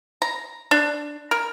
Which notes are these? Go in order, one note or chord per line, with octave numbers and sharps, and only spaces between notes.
A#5
D4
A#4